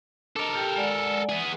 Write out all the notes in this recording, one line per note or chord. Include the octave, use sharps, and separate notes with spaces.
D4 A4 A#4 D#5
G4 G5
G#3 D5 F#5
B3 G#4